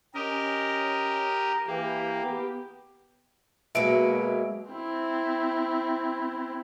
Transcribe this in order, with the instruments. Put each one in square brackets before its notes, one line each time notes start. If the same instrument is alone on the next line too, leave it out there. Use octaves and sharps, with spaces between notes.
[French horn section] C#4 [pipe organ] G4 A#4 D#5
[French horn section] E3 G4 [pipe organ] A#3
[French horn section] B3 G4
[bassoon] B2 [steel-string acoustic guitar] F#3 G#3 A#3 [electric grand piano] E5 D7
[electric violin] C4 E4